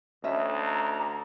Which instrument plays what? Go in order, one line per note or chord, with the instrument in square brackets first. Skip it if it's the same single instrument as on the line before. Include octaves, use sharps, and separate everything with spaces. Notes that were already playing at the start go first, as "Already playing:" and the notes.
[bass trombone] D2 [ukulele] C#4 D#5 E5
[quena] A#5